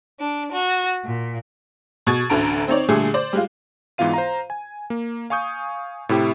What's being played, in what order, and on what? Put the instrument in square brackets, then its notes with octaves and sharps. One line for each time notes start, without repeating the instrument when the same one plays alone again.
[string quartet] D4
F#4
A#2
[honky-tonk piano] B2 C#6 G#6 A6
A1 D2 D3 A4 A#5 D7
C4 D#4 C#5 D5
A#2 D3 G3 A3 G#4
C5 D5
G3 G#3 F4
[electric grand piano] G#2 E3 B3 F4 F5 D#7
C5 F5 A#5
G#5
A#3
F5 G#5 C#6 D#6 G6
A2 C3 E4 G4